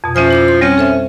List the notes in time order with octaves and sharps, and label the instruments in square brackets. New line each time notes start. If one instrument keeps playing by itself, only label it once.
[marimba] F2 B2
[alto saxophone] F3 [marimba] C#4 E5 G#5
[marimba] E4 D6 E6
C6
[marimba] G3 C4 [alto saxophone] C#4
[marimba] A4 C5 E5